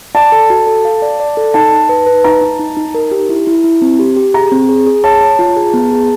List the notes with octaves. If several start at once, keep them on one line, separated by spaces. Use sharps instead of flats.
D5 A5
A4
F#4
A4
F5
D5
D5
A4
D#4 A5
D#4
B4
B4
D#4 A#5
D#4
D#4
D#4
A#4
G4
E4
E4
E4
C4
G4
G4
G#4 A#5
C4
G#4
G#4
C#5 A5
C#5
F4
G#4
B3
G#4